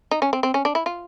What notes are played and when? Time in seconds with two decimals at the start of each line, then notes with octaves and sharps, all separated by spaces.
0.11 D#4
0.22 C#4
0.33 C4
0.43 C4
0.54 C#4
0.65 D4
0.75 E4
0.86 F4